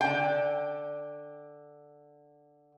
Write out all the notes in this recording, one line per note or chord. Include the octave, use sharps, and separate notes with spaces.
D3 G5